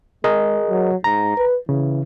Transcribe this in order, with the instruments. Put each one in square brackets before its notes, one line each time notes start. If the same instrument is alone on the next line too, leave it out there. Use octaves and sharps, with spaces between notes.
[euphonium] G#3 [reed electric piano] G#4 A#4 D#5
[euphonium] F#3
[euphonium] G#2 [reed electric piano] A#5
[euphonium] B4
[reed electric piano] C#3 [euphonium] E3